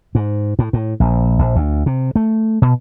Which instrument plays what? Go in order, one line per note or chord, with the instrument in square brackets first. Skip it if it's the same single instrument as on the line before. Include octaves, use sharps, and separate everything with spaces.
[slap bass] G#2
A2
A2
A#1
A#1
D2
C3
A3
B2